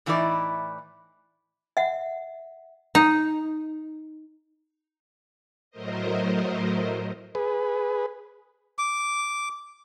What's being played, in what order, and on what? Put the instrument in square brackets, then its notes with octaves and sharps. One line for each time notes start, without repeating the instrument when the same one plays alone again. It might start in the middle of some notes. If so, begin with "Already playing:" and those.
[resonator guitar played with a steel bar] A2 E3 D#4 E4 A4 D5
[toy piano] E5 F#5
[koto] D#4
[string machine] A2 F#3 A3 A#4 C5 D#5
[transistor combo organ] G#4 B4
[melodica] D6